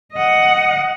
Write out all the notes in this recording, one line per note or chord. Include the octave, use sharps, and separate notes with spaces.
D#5 F#5